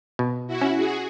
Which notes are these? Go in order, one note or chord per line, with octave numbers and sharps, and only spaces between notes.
B2
E4 F#4
C#4
F#4 G#4